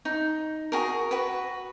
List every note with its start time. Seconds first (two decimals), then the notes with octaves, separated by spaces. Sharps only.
0.05 D#4
0.72 F#4 G#4 A#4
1.11 F#4 B4